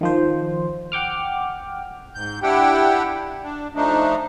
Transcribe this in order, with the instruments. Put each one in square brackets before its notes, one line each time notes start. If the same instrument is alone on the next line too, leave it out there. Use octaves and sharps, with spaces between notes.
[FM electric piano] D#3 F3 C5
F#5 G5 D6 F6
[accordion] G#2 G6
D4 E4 G4 F#5 G5
D4
F3 A3 D4 D#4